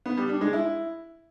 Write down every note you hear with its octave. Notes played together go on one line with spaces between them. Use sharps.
B3
G3
D4
G#3
E4